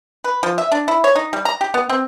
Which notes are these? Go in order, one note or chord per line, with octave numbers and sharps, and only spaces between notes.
B4
F3
E5
D4
E4
C#5
D#4
G3
A#5
G4
B3
C4